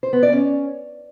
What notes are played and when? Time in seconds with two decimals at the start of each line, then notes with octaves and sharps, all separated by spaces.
0.03 C5
0.13 B3
0.23 D5
0.33 C#4